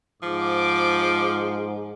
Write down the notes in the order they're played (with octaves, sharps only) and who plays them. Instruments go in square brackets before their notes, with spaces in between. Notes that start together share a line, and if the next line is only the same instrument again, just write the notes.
[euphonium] G#2 [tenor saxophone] F3 [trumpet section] D6